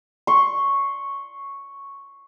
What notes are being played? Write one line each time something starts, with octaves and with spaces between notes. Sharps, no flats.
C6 C#6